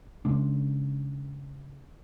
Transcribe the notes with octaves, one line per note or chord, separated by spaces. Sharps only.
C#3 G#3 D4